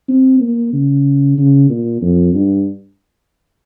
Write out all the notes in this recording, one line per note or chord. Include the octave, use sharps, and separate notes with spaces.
C4
A#3
C#3
C#3
A#2
F2
G2